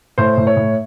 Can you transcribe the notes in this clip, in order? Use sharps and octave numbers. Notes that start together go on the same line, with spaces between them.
A2 C5
A2
C#5
A2